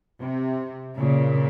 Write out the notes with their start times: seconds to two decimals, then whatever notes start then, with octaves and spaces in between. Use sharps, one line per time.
0.19 C3
0.97 A#2 C#3